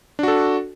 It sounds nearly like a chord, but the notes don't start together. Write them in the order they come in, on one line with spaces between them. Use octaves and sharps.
D4 F#4 A4